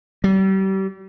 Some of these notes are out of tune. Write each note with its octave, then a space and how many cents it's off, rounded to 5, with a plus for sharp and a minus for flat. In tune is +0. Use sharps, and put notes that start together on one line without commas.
G3 -35